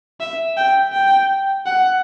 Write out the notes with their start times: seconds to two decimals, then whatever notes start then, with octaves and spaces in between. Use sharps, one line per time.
0.20 E5
0.57 G5
0.93 G5
1.66 F#5